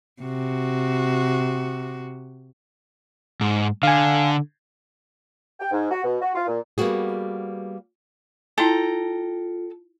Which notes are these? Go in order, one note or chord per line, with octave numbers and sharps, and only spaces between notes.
C3 F#4
G#2
D3 F5 G#5
G5
G#2
F#4
B2
F#4
F4
A#2
G3 A#3 B3 F#4 G#4
E4 F4 A4 G5 A5 A#5